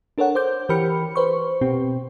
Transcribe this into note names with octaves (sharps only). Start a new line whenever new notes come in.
D4 A4 A#4 C#5 F#5
C5 D6 G6
E3 G4 A#4 B5 F6 C#7
B4 C5 C#6
B2 C4 G4